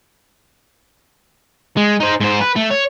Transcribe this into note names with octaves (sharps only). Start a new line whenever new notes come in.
G#3
D#4 C5
G#2 C5
B4
A3
C#5